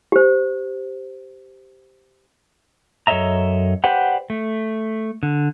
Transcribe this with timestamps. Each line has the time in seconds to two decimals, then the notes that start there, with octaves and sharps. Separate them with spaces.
0.12 G4 C5
3.07 F#2 A4 C#5 D#5 E5 A#5
3.84 G4 B4 C5 D5 F#5 G5
4.30 A3
5.23 D3